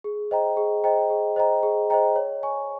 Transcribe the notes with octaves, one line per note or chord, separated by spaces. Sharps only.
G#4
C5 D#5 G5 A#5
G#4
C5 D#5 G5 A#5
G#4
C5 D#5 G5 A#5
G#4
C5 D#5 G5 A#5
C#5
G#5 C#6